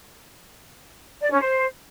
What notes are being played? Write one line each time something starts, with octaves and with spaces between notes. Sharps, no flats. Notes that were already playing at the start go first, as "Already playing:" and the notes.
D5
C#4
C5